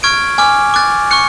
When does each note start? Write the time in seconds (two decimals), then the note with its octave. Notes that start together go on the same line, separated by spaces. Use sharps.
0.03 C#6 F6 G#6 D7
0.38 G#5 D6 F6
0.74 D6 F#6 A6
1.11 C#6 F#6 C#7